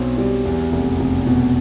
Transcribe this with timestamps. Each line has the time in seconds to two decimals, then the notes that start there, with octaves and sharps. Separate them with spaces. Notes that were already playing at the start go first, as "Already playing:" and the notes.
Already playing: B1 B2 C4
0.18 G3
0.45 E2
0.72 F1
1.00 F1
1.26 B2